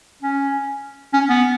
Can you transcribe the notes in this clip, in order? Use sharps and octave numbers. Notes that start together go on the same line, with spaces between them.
C#4
C#4
B3